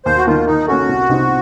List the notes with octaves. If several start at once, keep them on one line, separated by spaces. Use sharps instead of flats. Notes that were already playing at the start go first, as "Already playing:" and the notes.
D#2 C5
F#4
D#3 A#3 F4
D#3 D#4
A#3 C#4 F#4 A4
C2
C3 F3 C4 D#4